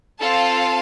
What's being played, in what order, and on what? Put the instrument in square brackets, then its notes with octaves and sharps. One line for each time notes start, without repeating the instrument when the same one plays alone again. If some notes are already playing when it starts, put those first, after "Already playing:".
[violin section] C4 F4 A4 F5 A5